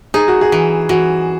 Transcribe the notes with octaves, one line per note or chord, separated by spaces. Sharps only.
D#4 G#4
F#4
G#4
E3
E3 F#4